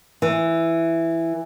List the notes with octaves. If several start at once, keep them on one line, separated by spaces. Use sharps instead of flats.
E3